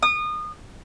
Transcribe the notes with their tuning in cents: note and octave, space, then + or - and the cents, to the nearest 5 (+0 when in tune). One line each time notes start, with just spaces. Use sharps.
D#6 -30